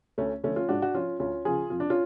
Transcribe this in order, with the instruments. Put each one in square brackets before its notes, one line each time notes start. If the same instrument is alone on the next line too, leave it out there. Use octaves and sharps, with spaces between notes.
[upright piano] D2 A3 C#4
D3 F3 A3 C#4
C#4 F4
G#2 D4 F#4
F#4
F3 C#4 F4
D2 C#4 F4
C#3 F3 F4 G#4
F2 F4
D4
C#4 F4